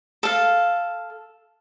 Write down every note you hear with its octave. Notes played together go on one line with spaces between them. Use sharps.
A4 F5